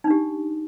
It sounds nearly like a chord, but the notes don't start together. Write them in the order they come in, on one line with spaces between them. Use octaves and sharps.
D#4 D4 G4